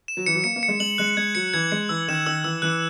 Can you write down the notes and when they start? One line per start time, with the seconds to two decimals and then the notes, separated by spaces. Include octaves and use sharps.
0.08 E7
0.17 F#3
0.26 E3 C#7
0.35 F#3
0.44 A#3 C#7
0.56 A#3
0.63 C#7
0.68 G#3
0.80 G#3 F#7
0.98 G#3 F#6
1.17 G#3 G#6
1.35 F#3 C#7
1.54 E3 G#6
1.72 G#3 C#7
1.89 E3 E6
2.08 D#3 E7
2.26 D#3 E6
2.44 E3 E6
2.62 E3 F#6